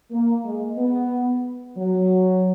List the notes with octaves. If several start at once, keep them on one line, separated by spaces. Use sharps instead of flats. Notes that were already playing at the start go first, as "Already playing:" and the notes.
A#3
G#3
B3
F#3